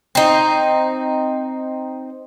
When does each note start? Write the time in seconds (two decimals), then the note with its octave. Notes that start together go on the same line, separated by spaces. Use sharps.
0.15 C4 D#4